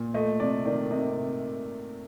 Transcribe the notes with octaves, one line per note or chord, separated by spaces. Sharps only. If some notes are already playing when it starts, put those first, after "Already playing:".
Already playing: A#2
A3 D#5
C3 D5
D#3 D5
C3 D#5